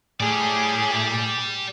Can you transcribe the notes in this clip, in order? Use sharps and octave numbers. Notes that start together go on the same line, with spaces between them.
A2 G4 G#4 D5